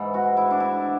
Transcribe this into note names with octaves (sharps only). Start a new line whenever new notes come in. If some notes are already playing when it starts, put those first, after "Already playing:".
Already playing: G#2 E3
F#4
E4
D4
E4